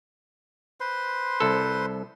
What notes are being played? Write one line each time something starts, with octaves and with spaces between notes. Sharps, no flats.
B4 C5 C6
C2 A4